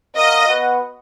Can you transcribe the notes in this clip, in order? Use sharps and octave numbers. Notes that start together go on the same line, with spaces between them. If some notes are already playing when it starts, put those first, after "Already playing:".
F#4 A#4 D#5 F5
B3 F#4 B4 F#5